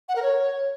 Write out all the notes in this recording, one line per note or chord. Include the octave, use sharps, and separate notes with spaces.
F#5
A#4
C#5